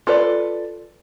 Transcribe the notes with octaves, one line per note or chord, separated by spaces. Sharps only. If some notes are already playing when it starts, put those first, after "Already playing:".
F4 A4 B4 D5